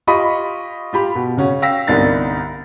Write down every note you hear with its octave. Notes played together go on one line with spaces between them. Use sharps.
F4 G4 D#5 B5 C#6
F4 G4 B5
B2
C#3 C#4 F#4
F5 G5 E6 A#6 B6
G1 C2 D4 D#4 A6